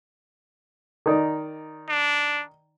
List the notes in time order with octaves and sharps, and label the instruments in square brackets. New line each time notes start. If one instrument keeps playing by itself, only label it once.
[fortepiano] D#3 D#4 D5
[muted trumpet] D4